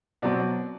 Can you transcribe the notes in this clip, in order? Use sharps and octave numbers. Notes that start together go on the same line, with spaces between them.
B2 F#3 C4 D5